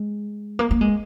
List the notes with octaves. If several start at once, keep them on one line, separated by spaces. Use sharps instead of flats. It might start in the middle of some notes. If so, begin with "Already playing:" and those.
Already playing: G#3
A#3
A#3
G#3